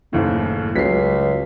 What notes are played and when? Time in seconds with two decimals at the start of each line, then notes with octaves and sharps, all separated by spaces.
0.13 F#1 D#2 A2 A3
0.76 C#2 F#3 B6 C7
1.09 F#3